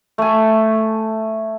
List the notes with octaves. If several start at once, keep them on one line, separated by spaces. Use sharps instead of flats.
A3 G#5